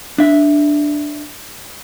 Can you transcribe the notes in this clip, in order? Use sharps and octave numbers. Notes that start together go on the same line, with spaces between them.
D4 E5